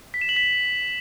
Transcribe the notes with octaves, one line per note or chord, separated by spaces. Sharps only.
B6
E7
F#7
B6